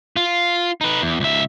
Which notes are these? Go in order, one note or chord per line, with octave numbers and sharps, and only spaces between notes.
F4
D#4 B4
E2
C#2 E5